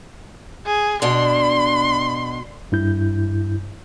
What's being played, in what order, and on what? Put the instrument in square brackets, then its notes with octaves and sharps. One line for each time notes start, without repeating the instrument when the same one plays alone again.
[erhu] G#4
[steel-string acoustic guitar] B2 D4 [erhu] C6
[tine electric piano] G2 E4 G6